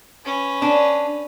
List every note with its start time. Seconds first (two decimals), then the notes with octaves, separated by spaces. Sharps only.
0.25 C#4 B4
0.62 D4